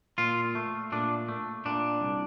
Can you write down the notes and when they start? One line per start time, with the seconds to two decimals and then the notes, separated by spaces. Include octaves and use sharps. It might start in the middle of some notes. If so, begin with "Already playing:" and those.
0.18 A#2 F4
0.55 A3
0.92 A#2 D4
1.28 A3
1.65 A#2 D4
2.01 C2